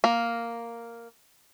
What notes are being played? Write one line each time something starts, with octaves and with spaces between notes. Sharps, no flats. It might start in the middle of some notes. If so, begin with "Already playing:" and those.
A#3